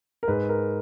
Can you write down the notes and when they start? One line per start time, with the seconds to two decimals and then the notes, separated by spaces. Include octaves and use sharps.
0.23 A#4
0.28 G#2 B4
0.49 A#4